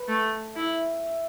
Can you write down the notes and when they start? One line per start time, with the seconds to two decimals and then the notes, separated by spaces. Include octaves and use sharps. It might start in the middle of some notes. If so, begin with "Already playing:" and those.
Already playing: B4
0.08 A3
0.56 E4 E5